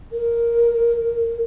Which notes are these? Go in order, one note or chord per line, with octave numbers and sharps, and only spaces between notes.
A#4